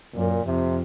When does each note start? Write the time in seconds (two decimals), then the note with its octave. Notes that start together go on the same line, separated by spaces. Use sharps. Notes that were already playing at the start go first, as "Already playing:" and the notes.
0.14 F#2 A#2
0.46 F2 C3